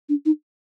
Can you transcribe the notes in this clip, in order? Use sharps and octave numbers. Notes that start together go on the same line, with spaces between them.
D4
D#4